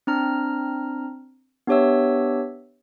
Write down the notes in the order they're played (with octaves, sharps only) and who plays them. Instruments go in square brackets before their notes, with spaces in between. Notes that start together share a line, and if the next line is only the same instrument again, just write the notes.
[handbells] C4 D4 A#5 F6
B3 D4 G4 C#5 E5 E6